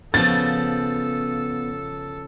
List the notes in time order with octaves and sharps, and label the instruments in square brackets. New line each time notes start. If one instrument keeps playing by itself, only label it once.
[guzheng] C#3 F3 [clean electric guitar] B3 [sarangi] A4 [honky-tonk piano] A6